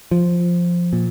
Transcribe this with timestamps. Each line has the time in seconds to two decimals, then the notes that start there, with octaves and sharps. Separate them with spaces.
0.11 F3
0.93 A#2